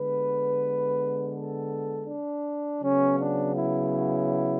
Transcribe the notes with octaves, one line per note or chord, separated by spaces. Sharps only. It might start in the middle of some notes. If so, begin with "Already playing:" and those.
Already playing: D3 G#3 B3 B4
A4
D4
C#3 F#3 B3 C#4
D4
E4